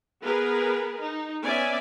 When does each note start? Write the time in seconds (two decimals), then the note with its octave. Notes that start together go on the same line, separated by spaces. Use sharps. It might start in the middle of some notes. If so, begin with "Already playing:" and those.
0.23 B3 G#4 A#4 B4
1.02 D#4
1.45 B3 C#4 D5 E5 G#5